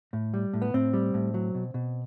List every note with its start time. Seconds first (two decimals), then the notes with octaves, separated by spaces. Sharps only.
0.13 A2
0.34 G3
0.53 A2
0.62 B3
0.74 A2 C4
0.93 G3
1.14 A2
1.34 F#3
1.55 B2
1.74 B2